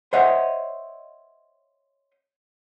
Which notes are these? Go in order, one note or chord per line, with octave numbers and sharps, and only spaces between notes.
C5 C#5 D#5 E5 F#5